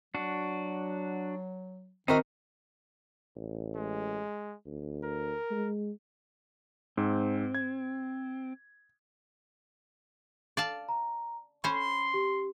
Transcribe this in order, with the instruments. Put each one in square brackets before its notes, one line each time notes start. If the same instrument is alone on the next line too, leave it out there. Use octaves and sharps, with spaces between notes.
[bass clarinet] F#3 [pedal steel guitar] D4 F#4
[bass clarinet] D#3 [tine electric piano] C4 A#4 [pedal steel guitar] D#4 C5 [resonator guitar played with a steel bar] E4 F#4 D#5
[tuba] A1
[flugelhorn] G#3
[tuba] D2
[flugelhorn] A#4
[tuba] G#3
[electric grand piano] G#2 [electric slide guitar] C4
[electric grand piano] G#6
[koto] D5 F5 A5
[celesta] A#5
[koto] C#4 C5 [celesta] B5 [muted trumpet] C6
[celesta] G4